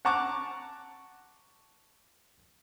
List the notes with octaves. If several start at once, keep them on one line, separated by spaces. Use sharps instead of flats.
F#5 A5 A#5 C#6 D6 F#6